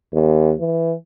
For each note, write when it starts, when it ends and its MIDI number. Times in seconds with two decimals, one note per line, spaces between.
0.13 0.53 39
0.60 0.93 52